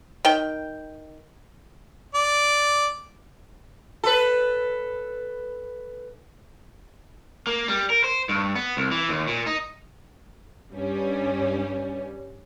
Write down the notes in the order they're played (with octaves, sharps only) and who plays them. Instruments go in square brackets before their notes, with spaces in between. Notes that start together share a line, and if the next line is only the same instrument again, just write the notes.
[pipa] D#3 G5
[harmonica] D5
[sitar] A4 B4
[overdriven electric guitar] A#3
G3
A#4
C5
G2
B3
C2
E3
D#2
A#2
D#4
[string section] G2 G3 C#4